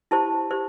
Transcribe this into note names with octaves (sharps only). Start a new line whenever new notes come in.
E4 G4 C5 A5
G4 C5